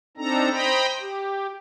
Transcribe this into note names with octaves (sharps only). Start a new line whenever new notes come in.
C4 D4 D#4 A4 A#5
C5 D#5 G5 A#5 B5
G4